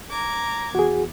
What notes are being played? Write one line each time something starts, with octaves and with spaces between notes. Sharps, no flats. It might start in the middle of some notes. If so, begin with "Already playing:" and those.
A#5 D6 G#6
E2 F#4 G#4